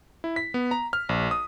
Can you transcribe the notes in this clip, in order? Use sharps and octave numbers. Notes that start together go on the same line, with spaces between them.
E4
B6
B3
A#5
F6
A#1
D#6